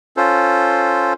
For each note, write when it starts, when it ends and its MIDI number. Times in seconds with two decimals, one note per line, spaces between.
0.17 1.13 61
0.17 1.13 65
0.17 1.13 69
0.17 1.13 72